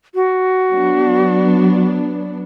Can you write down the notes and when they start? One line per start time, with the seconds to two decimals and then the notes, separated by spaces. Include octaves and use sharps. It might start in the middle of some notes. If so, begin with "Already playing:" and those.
0.15 F#4
0.73 F#3 B3 D4